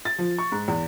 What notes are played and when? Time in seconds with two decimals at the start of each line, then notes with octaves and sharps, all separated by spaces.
0.05 A6
0.18 F3
0.38 C#6
0.52 G#2
0.68 E2